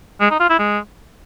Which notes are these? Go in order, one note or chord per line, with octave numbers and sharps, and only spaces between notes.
G#3
D#4
F4
E4
G#3